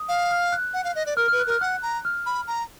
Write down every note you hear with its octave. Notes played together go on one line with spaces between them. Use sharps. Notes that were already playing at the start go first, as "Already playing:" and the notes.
Already playing: D#6
F5
F6
F#6
F#5
F5
D#5
D5
A#4 F6
B4 F6
F#6
A#4 F6
F#5 F#6
A#5
F6
B5
A#5